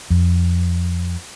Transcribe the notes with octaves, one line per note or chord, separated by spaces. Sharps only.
F2